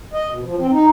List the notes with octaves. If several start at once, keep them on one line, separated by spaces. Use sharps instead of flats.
D#5
B2
F3
C4
D#4